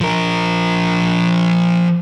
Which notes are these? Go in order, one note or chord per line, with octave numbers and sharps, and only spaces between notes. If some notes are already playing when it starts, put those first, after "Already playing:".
F3 A#4